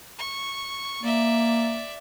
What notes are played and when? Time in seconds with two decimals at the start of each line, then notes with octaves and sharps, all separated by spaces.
0.18 C#6
1.03 A#3 D5 E5